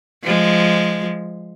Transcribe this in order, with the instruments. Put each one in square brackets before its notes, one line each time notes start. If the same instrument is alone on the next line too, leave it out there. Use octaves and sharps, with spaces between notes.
[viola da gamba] F3 G#3